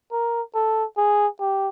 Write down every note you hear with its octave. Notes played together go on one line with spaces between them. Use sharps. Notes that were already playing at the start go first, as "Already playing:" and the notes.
A#4
A4
G#4
G4